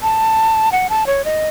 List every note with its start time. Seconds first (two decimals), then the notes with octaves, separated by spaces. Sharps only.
0.02 A5
0.72 F#5
0.90 A5
1.07 C#5
1.25 D#5